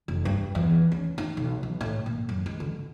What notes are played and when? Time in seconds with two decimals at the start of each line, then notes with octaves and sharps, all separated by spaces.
0.08 F1
0.25 G2
0.55 E2
0.92 C#4
1.18 D#4
1.37 B1
1.63 B1
1.81 A2
2.06 A#2
2.29 F#2
2.46 G#3
2.60 D3